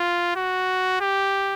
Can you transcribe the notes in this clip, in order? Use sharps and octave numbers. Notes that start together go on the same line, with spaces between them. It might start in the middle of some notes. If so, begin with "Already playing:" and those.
Already playing: F4
F#4
G4